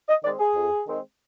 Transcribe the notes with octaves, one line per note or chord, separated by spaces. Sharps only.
D#5
D#3 G#3 C4 D5
G#4
F2
D#3 G#3 C4